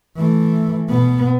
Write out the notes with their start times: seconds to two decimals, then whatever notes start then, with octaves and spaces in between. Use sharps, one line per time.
0.17 E3 A3
0.89 B2 B3